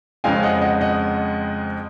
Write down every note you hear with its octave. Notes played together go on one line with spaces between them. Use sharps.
F2 C#3 G#3 C4 F5 G#5
D#5 F#5
D#5 F#5
D#5 F#5